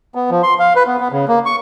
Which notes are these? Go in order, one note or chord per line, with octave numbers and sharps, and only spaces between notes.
B3
F3
C6
F5
B4
B3
B3
C#3
A#3
C#6